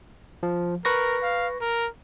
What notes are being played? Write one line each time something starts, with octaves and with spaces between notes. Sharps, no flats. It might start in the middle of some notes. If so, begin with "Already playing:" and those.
F3
A#4 B4 C#6 A#6
F5
A#4